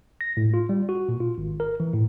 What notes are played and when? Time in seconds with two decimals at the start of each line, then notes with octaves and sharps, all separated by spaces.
0.21 A#6
0.37 A2
0.54 F4
0.69 G3
0.89 F#4
1.09 A#2
1.20 F4
1.38 G#1
1.60 A#4
1.80 E3
1.94 A2